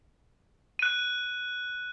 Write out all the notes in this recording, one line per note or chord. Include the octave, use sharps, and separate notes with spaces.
F#6 D#7